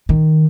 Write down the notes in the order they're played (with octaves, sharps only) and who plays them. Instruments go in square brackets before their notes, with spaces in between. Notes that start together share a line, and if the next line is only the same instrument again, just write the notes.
[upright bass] D#3